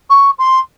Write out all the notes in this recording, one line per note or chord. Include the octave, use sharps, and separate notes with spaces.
C#6
C6